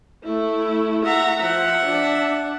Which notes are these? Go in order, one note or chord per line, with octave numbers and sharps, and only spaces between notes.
A3 E4
E5 F#5 A#5
F3 E5 F#5
D4